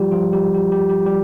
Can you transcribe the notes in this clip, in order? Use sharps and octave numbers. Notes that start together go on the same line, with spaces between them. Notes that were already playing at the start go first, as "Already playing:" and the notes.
Already playing: F3 G3 F4 G4
F3 F4
G3 G4
G4
G4
G4
G3 G4